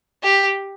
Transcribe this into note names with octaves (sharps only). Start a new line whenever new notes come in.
G4